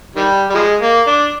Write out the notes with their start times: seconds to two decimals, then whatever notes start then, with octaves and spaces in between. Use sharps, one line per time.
0.16 D#3 G3
0.50 G3
0.54 F3 G#3
0.82 A#3
1.07 D4